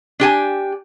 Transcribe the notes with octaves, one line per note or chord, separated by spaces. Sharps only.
D4 G4 G#5